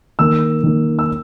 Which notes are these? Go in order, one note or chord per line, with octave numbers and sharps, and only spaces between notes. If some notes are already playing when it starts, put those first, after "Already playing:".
D#3 A#3 E6
D#3 A#3
E6